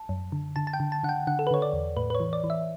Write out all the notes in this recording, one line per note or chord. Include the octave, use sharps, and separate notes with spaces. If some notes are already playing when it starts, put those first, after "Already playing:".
Already playing: A5
F#2
D3
D3 A5
A5
G5
D3
A5
D3 F#5
G5
D3 F#5
A4
B4
D3 C#5
D5
E2
A2 B4
B4
C#5
E3
D5
E3
E5